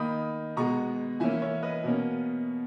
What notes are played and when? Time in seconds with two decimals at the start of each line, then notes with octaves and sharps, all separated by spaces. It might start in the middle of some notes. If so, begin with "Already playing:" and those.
Already playing: D#3 A#3 D#4 B5 D#6
0.56 B2 G#3 B3 A#5 C#6
1.20 E3 A#3 C#4 E5 G#5
1.42 C#5 E5
1.62 B4 D#5
1.84 B2 A#3 C#4